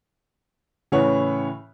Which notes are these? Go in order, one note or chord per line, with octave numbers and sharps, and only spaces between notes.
A2 C#3 E3 C#5 F#5